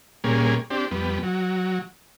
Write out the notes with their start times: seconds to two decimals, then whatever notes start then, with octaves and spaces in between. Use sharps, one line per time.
0.24 A#2 G3 A#3 C#4 G#4
0.70 C4 D4 G4
0.91 F2 G3 B3
1.23 F#3